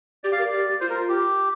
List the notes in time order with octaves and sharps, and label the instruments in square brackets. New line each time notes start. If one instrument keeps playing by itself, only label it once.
[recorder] G4 [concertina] D5
[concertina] F5
[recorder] A#4 [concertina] D5
[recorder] G4
[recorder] F4 [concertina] C5
[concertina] A#4
G4